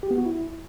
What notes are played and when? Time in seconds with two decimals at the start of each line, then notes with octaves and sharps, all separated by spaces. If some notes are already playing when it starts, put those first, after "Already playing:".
0.03 G4
0.11 B3
0.18 F#4
0.26 E4